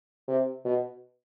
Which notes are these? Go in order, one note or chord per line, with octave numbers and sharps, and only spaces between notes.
C3
B2